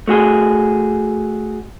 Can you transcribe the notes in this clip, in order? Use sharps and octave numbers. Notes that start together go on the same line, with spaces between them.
A3 F#4 G#4